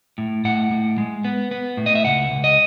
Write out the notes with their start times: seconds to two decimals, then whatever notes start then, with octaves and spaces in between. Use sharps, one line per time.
0.18 A2
0.45 A2 F#5
0.71 A2
0.98 G#3
1.24 B3
1.51 B3
1.77 A2
1.86 D#5
1.95 E5
2.04 C#2 F#5
2.31 C#2
2.44 D#5